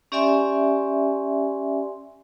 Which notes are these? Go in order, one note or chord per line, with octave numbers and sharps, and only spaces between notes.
C#4 G4 D5 E5 G#5 C6